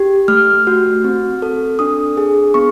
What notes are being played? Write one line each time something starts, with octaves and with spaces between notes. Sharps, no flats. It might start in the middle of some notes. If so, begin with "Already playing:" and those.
Already playing: G4
A3 F6
F#4
C4
A4
D4 D#6
G#4
B3 C#6